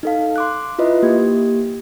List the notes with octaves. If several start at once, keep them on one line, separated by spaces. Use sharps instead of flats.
D#4 A4 F5
C6 D6 F#6
E4 F4 B4 D#5 E5
A#3 G4 G#6